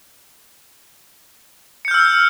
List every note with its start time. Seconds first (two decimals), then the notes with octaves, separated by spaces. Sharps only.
1.85 C#7
1.88 G6
1.91 F6
1.94 E6